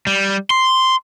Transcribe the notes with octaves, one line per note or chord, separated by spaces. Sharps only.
G3
C6